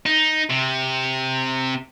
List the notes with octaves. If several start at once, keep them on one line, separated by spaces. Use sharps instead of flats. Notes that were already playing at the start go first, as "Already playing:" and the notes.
D#4
C3